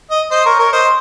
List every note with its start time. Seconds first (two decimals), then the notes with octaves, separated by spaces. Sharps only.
0.11 D#5
0.31 C5 D#5
0.45 A#4 C#5
0.59 A#4 C#5
0.72 C5 D#5